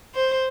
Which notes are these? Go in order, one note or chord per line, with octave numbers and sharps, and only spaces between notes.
C5